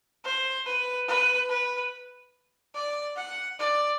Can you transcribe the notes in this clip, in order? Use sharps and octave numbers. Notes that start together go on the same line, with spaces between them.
C5
B4
B4
B4
D5
F#5
D5